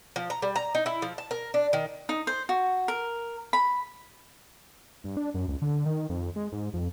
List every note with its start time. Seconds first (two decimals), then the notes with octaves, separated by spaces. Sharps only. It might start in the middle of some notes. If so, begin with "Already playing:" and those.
0.16 F3
0.30 A#5
0.42 G3
0.56 A#5
0.75 D#4
0.86 E4
1.02 F3
1.18 A5
1.31 A#4
1.54 D4
1.73 D#3
2.09 D#4
2.27 C5
2.49 F#4
2.88 A#4
3.53 B5
5.04 G2
5.17 D4
5.34 F#2
5.48 C#2
5.62 D3
5.86 D#3
6.09 F2
6.36 G#3
6.52 G#2
6.73 F2